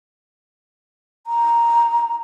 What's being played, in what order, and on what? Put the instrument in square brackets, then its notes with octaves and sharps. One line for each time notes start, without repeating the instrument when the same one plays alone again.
[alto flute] A#5